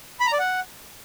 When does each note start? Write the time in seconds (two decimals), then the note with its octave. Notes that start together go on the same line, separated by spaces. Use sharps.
0.20 B5
0.26 A#5
0.33 D5
0.39 F#5